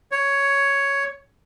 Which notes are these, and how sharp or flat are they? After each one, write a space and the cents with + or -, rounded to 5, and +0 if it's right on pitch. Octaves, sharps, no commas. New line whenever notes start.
C#5 +5